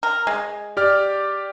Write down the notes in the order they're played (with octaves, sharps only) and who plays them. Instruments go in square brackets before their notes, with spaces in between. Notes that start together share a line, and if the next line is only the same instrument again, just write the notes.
[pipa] A#4
G#3
[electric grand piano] G4 D5 F6